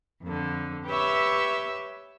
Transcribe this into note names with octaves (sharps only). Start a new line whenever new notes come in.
F2 D3
G4 B4 C#5 E5 C#6 E6